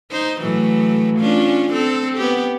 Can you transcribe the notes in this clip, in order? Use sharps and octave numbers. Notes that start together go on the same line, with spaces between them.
D#4 C5
A2 E3 F#3
C#4 D4 F4
C4 A4
B3 G4